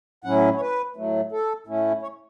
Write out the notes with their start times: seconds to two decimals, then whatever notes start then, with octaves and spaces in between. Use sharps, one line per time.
0.24 A2 F#3 C#4 E4 F#5
0.56 C#5
0.61 B4
0.96 A2 F#3 A3
1.32 A4
1.67 A2 A3 C#4 E4
2.02 C#5